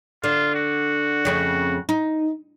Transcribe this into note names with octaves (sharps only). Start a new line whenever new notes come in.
D3 F4
F#4
F2 C#3 A3
D#4